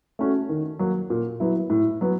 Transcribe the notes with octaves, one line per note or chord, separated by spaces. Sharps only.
A3 C#4 F#4
D#3
F#3 A#3
A#2
F#3 B3 E4
A2
F#3 B3